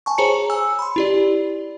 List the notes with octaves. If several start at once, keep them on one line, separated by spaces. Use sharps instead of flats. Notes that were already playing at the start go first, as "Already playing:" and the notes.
G#5 A5 C#6
G#4 C5 C#5 A#5 C#7
G#5 E6
B5 C6
E4 G4 D5